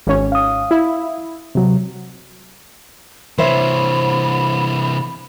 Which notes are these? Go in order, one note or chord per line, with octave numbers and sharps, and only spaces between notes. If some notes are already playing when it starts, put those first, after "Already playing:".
G#1 C#4
F5 D#6
E4
C3 F#3
C3 E3 C5 C#5 E5 B5